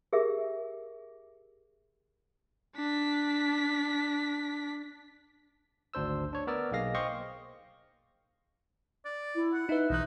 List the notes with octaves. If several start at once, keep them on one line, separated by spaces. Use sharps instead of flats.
G4 G#4 A#4 E5
D4 B6
G#1 D2 D4 C5 E6
D4 C#5
B3 A#4 D5 E6 F6
B1 A#3 G#4 D#5 F5 A#6
C5 D#5 F5 G5 C#6 D6
D5
E4
F#5
D#4 B4 E5
B1 E3 D#4 F#6